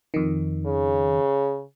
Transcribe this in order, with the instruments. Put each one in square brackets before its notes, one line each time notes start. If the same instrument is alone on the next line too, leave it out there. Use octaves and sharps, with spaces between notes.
[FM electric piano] F2 D#3
[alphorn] C#3